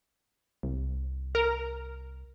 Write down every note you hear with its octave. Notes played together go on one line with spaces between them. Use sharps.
C2
A#4